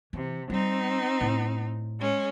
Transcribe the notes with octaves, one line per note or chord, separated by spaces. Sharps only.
C3 E3
G3 C4 D#4
A2
G#3 C#4